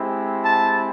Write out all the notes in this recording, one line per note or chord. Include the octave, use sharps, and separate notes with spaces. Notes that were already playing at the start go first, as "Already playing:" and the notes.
Already playing: G#3 C4 E4 G4
A5